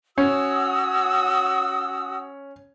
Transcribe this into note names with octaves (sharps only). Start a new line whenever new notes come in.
C#4 F#4 D#6 E6